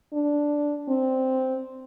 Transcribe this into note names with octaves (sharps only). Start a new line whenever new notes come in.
D4
C4